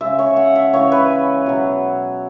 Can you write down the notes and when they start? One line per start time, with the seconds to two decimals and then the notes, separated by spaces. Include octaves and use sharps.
0.01 C#3 G#3 E5
0.19 C#5
0.37 F#5
0.56 E5
0.73 C#3 E3 G#3 C#5
0.92 B4
1.46 B2 F#3